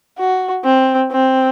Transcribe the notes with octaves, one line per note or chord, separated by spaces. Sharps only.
F#4
C4
C4